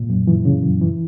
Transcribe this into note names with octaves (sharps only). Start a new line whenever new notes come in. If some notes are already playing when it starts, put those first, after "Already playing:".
Already playing: A#2
F#2
E3
C#3
F#2
E3